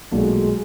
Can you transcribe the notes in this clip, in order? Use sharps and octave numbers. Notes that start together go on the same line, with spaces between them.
B1 A#2 F#3 G#3 A3